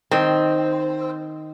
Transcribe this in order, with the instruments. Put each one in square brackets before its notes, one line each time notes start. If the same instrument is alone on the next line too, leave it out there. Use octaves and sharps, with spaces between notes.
[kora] D#3 [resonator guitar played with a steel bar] C4